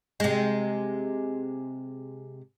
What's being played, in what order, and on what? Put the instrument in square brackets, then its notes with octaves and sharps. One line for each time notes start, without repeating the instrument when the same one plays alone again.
[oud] C3 G#3